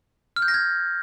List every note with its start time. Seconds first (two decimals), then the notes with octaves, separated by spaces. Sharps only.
0.36 F6
0.42 G6
0.48 A#6
0.54 G#6